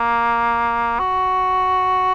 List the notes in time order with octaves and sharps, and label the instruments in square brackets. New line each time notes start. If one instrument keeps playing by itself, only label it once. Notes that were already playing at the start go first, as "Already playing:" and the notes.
Already playing: [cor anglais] A#3
F#4